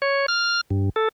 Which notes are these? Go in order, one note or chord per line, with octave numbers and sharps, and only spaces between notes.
C#5
F6
G2
A4